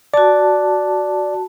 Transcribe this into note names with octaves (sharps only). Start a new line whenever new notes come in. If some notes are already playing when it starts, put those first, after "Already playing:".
F#4 D5 A5